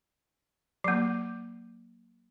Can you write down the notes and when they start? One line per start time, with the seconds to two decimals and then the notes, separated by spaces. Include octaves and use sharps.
0.84 F#3 A#3